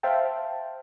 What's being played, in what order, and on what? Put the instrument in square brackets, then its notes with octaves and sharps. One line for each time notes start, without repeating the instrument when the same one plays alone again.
[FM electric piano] C5 E5 F5 G5 A5